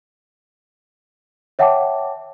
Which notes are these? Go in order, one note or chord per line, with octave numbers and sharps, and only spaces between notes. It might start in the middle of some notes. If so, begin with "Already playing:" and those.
C#5 E5 F#5 G5 A5 D6